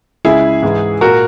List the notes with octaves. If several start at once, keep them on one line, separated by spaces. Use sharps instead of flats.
C#2 C#3 G#3 E4 G#4
G#2 E3 G#3
A#2 A#3 F#4 A#4